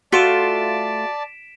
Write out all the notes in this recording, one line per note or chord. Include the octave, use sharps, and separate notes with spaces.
A3 F4 F#4 D5 A5 B6 D7 E7